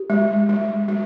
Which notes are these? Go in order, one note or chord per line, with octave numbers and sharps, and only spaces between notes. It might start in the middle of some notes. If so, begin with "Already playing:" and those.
Already playing: G4
G#3
G#3
G#3